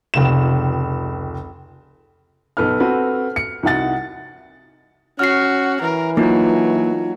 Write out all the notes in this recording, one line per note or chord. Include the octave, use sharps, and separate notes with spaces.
F1 C#2 E7
B1 B3 A4 B4 F6
C4 F#4 A4 B4
C#7
C2 D#4 F#4 F#5 A6
C#4 F#4 F#5 F6 C7
E3 A#4
F#3 A#3 D#4 F4